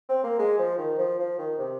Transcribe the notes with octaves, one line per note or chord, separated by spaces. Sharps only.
C4
A#3
G#3
F3
D#3
F3
F3
D#3
C3